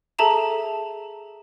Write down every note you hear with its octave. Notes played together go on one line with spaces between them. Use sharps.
G#4 A4 E5 A5 A#5 E7